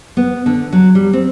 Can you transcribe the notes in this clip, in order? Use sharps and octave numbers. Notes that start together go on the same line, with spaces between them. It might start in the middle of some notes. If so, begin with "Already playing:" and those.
B3
D3
F#3
G3
C4